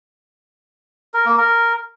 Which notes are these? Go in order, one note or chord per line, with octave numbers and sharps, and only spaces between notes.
A#4
A#3
A#4